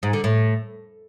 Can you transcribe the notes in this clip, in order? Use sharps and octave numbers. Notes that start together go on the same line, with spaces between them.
G#2
D3
A2